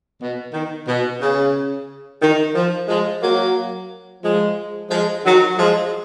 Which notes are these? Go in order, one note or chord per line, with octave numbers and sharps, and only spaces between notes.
B2
D#3
B2
C#3
D#3
F3
F3 G#3
F#3 A#3
F3 G#3
F3 G#3
D#3 F#3
F3 G#3